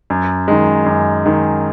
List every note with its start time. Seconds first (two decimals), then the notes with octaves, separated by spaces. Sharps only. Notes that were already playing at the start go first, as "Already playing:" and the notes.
0.10 F#2
0.48 D#3 G#3
0.86 F#2
1.26 D#3 G#3